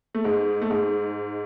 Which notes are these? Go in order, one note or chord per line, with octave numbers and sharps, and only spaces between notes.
A3
G#2 G#3
A3
G#2 G#3